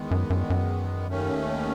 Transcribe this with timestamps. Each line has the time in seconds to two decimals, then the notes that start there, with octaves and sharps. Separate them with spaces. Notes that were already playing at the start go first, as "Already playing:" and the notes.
Already playing: E2 D#3 G#3 B3
0.11 F#2
0.30 F#2
0.50 F#2
1.07 D#2 D#3 A3 C#4